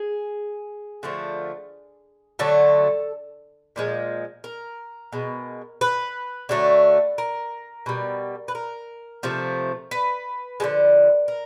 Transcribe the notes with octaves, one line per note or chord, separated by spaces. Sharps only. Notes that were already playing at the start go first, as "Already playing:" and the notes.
Already playing: G#4
D3 F3 A3
D3 F#3 A3 A4
A#2 F3 G#3
A#4
B2 G#3
B4
D3 F#3 A3
A#4
B2 G3
B4
A#4
C3 F3 A3
B4
D3 F3 G#3
A#4